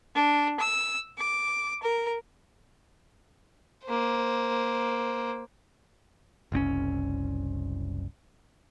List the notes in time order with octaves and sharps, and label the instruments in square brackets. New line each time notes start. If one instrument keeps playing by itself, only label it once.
[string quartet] D4
E6
D6
A#4
[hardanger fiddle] A#3 C5
[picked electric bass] F#1 C2 C4 C#4